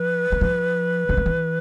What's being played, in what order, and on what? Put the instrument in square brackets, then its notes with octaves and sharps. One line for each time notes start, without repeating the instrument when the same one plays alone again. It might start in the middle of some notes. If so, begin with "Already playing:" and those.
Already playing: [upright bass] F3 [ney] B4
[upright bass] E3
F3
D3
D#3
E3